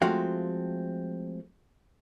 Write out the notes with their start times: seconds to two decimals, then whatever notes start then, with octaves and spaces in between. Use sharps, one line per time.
0.02 F3 G#3 A3 C4 F#4 F5